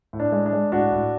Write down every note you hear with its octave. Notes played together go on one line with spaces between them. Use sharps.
A2
D4
G#3
D4
G#3
A2 D4 F#4
A2